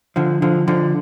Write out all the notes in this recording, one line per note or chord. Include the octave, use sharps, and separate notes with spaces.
D3 F3
D3 F3
D3 F3